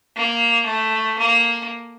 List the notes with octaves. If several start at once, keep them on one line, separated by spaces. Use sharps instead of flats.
A#3
A3
A#3